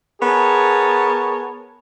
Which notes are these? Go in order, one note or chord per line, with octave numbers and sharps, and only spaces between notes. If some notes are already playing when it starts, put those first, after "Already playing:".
B3 G#4 A#4 C#5 G#5 A5